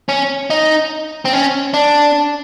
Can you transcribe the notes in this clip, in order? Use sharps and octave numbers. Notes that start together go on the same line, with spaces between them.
C#4
D#4
C4
C#4
D4